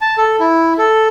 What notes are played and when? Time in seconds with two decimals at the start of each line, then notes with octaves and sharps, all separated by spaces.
0.01 A5
0.18 A4
0.40 E4
0.78 A4